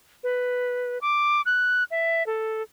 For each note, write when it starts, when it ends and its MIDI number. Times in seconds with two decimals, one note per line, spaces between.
0.23 0.98 71
1.01 1.41 86
1.46 1.83 90
1.91 2.26 76
2.26 2.62 69